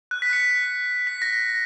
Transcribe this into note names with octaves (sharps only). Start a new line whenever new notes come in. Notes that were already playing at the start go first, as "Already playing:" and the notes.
F#6
B6
C#7
B6
A#6